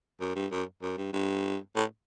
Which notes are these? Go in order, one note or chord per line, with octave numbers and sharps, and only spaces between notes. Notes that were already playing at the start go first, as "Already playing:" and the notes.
F#2
G2
F#2
F#2
G2
G2
A2